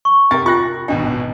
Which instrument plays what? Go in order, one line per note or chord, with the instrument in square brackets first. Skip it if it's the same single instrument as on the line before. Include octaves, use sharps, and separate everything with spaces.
[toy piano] C#6
[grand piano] C3 A#4 A6 [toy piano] G5
[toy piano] F4 G5 [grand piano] C#6 F#6 A#6
[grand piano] G#1 B2 D#4 [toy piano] D4 G5